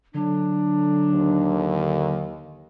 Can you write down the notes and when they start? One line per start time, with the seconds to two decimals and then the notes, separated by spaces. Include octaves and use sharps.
0.14 D3 F#3 D4
1.10 D#2